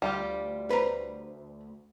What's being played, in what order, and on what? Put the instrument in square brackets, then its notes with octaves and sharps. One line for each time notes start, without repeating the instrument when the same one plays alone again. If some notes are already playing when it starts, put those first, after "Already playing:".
[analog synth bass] D2 [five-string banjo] G3 F4 G4
[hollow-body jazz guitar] B4 C5 A#5